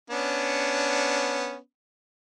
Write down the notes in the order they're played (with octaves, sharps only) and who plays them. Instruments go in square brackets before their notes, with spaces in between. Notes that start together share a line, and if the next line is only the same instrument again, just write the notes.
[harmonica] B3 C#4 D4